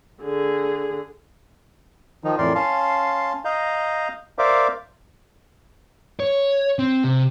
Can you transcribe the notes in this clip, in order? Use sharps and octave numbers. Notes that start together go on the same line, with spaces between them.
D3 G#4
D#3 F3 D#4
F2 A2 E3 A#4 D5 C6
C#4 F5 A5 C6
D#5 F5 A#5 G6
A#4 C5 D5 E5 F5 D6
C#5
C4
C3